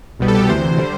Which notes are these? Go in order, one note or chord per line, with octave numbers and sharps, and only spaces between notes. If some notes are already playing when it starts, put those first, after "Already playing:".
C2 B2 G3 B3
A4
G4
D2 C3 E3 C5
D3 G3